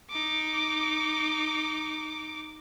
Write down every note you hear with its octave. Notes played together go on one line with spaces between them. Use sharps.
D#4 D6